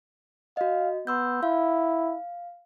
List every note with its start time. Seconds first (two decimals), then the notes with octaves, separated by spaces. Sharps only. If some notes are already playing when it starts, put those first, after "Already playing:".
0.57 F#4 D#5 F5
1.07 B3 C6 E6 G6
1.43 E4 F5